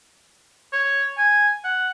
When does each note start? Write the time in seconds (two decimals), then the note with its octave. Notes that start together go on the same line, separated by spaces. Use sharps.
0.72 C#5
1.17 G#5
1.64 F#5